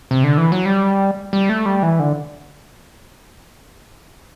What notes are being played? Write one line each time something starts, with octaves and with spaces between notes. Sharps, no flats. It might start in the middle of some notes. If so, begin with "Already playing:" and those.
C3
D3
E3
F#3
G3
G3
A3
G3
E3
D3